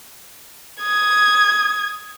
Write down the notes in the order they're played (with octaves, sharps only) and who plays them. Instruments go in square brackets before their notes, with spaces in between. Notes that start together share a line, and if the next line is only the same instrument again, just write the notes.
[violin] D#6 G#6